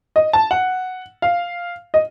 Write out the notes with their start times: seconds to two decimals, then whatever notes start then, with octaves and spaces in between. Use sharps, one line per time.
0.16 D#5
0.33 A5
0.51 F#5
1.22 F5
1.94 D#5